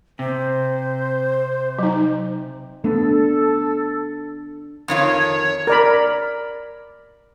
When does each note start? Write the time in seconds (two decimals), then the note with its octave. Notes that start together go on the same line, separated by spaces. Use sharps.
0.19 C3 C5
1.79 F#3 D#4
2.84 A3 B3 D4 A4
4.88 F2 D#3 F4 C#5
5.67 A#4 D5 B5